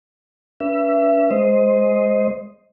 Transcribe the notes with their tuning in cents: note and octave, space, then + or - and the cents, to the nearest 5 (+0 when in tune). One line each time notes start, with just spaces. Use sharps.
C#4 +45 B4 -20 E5 +25
G#3 +0 C5 +0 D#5 +10